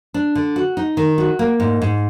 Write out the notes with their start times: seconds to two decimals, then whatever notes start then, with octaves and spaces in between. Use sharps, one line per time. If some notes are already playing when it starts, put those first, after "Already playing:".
0.14 D4
0.35 D3
0.56 F#4
0.77 D#4
0.97 D#3
1.18 F#4
1.39 A#3
1.60 G#2
1.82 G#2